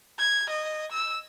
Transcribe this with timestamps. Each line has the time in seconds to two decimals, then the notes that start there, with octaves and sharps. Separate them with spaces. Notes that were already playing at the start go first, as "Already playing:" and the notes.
0.19 G#6
0.50 D#5
0.92 E6